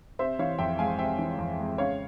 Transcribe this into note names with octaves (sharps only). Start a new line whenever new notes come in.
C3 C5 E5
E3 C#5 F5
F2 E5 G5
G#3 F5 G#5
C3 E5 G5
E3
F2
G#3
C#3 C#5 F5